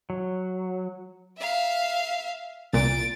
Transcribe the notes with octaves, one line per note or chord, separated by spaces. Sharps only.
F#3
E5 F5
C2 A#2 A6 D7